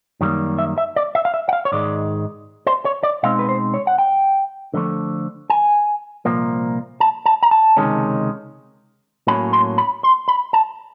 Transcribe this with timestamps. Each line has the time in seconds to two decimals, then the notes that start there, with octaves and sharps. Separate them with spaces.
0.21 F#2 D#3 G3 A#3
0.58 E5
0.78 E5
0.96 D5
1.15 E5
1.25 F5
1.34 E5
1.49 F#5
1.53 F5
1.65 C#5
1.72 G#2 D#3 G#3 D5
2.67 C5
2.85 C#5
3.03 D5
3.23 B2 G#3 C4 D#4 F5
3.39 B4
3.49 C5
3.74 C#5
3.87 F#5
3.98 G5
4.74 D3 F3 A3
5.50 G#5
6.25 C2 A#2 F3 A#3
7.00 A5
7.26 A5
7.43 A#5
7.51 A5
7.77 C#2 C3 D#3 G#3 C#4
9.27 A2 F#3 A#3 C#4 B5
9.53 C6
9.78 B5
10.03 C6
10.28 B5
10.53 A5